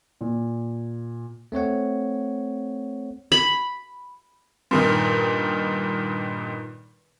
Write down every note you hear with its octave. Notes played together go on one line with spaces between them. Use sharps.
A#2
A3 C4 C#5 F#5
B5
G2 A#2 D#3